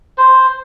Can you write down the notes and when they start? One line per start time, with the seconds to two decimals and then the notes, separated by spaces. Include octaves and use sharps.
0.18 C5